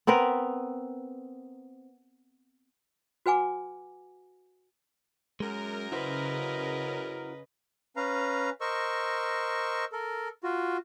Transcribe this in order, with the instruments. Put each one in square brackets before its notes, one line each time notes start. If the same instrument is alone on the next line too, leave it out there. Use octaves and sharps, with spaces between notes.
[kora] B3 C4 A#4 B4
[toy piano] F#4 B4 F#5 G#5 D6
[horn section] F#2 A#4 [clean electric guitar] G#3
[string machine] C#3 [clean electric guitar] E4 F#4 C5 [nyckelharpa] B4 D#5
[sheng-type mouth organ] C#4 B4 F5 A#5
A#4 C5 D#5 C#6 E6
A4 A#4
F4 F#4